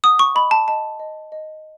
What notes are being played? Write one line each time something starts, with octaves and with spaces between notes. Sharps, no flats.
F#5 D#6
C#6
D#5 B5
A5
D#5 A5
D#5
D#5